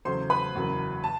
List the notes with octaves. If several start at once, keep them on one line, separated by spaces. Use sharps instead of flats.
E2 C#3 F#3 A3 C5 C6
B4 B5
F#1 E2 C#3 F#3 A#3
A5